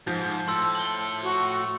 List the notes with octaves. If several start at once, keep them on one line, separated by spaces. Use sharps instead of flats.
G#2 F3
A2 A4 C6 E6
F#7 G7
F#4